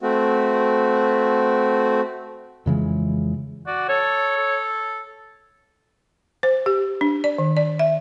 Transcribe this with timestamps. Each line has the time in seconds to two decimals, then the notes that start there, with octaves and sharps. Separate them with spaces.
0.02 A3 C4 F#4
2.66 F2 C#3 E3 G#3
3.67 F#4 D5
3.89 A4 C#5
4.37 A4
6.43 C5
6.66 G4
7.01 D4
7.24 D5
7.38 D#3
7.57 D5
7.79 E5